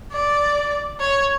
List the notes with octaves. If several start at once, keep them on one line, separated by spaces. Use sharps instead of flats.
D5
C#5